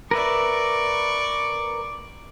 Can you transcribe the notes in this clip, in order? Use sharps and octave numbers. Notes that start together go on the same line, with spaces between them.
A#4 B4 D5 E5 C#6 D6